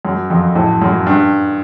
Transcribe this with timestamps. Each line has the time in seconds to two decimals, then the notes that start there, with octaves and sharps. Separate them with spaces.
0.05 F#2
0.30 F2
0.55 A2
0.82 F#2
1.07 G2